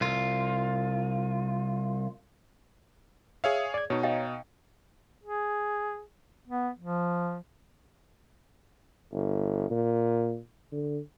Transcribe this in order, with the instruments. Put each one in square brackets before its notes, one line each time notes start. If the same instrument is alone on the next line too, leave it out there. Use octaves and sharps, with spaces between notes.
[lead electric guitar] C2 F4
[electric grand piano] G#4 C#5 F5 [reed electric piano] E5
[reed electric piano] D5 G#6
[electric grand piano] B2 D#4 [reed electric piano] C#5
[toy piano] D#5 F5 G5
[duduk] G#4
B3
F3
[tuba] G1
A#2
D3